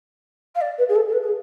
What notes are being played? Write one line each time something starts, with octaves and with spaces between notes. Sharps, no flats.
F5
D5
B4
G#4
A4
A4
B4
G#4